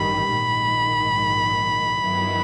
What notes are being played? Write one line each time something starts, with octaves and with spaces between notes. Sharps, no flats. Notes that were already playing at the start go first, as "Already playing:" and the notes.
Already playing: A1 G2 D#3 G3 B5
A#1 G#2 D#3
G2 D#3 F#3 B3 E4